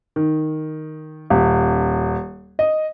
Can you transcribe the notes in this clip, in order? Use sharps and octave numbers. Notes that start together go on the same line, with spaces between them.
D#3
D#1
D#5